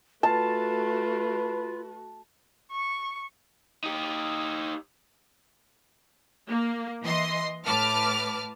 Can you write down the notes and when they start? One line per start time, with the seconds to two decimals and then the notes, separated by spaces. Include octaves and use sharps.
0.23 A3 F4 F#4 B4 A5
2.71 C#6
3.84 D#4 G4
6.48 A#3
7.03 E3 D#5 C6
7.65 A2 B4 A5 D6 F6